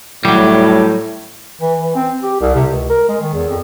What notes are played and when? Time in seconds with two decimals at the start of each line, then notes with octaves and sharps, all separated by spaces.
0.25 A2 F#3 G3
1.61 E3
1.80 E3
1.95 C4
2.22 G4
2.41 C2
2.55 C3
2.70 C#2
2.90 A#4
3.09 G#3
3.21 D#3
3.34 E2
3.49 F2